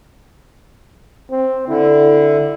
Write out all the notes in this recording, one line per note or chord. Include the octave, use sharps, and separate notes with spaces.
C4
D3 E4